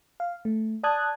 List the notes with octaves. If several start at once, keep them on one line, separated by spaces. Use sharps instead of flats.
F5
A3
D5 A5 D#6 F#6 G#6